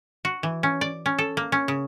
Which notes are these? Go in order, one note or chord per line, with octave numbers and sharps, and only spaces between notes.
F#4
E3
C#4
D5
C#4
A4
A#3
C#4
C#3